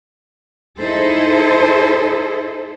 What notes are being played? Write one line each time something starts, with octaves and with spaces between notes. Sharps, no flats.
D#4 E4 G#4 A4 C5